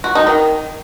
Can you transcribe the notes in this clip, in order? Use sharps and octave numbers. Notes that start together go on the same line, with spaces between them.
F#4
D#4
D#3